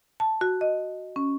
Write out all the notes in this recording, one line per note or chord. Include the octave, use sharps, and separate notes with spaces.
A5
F#4
D#5
C#4